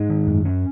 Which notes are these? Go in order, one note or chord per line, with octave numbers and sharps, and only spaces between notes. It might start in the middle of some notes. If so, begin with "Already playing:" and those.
Already playing: G#2 G#3
D#3
F#2
C#4